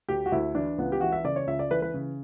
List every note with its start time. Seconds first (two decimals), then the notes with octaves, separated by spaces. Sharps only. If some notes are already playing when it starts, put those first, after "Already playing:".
0.09 D2 G4
0.26 F#4
0.32 D2 E4
0.55 E3 D4
0.78 C#2 B3
0.92 G4
1.01 E3 F#4
1.12 E5
1.24 C#3 D5
1.36 C#5
1.47 C#2 E5
1.59 D5
1.70 E3 B4
1.82 B4
1.94 C#3